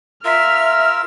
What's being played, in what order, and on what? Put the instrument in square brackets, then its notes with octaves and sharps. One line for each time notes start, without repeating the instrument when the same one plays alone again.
[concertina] F4 A#4 E6 [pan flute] E5 [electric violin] F6